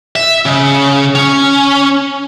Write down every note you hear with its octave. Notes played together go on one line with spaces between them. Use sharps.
E5
C#3
C#4